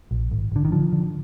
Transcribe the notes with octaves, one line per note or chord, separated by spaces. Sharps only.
A#1
G#1
G#1 D3
D#3
D3 F3
D3